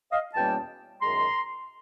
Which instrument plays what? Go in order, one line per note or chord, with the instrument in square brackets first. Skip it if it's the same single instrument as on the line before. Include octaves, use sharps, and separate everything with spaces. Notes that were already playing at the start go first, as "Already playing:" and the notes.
[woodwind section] D#5 F5
E2 B2 G3 A#3 C#4 G5 A5
F#2 D#3 G#3 A#5 C6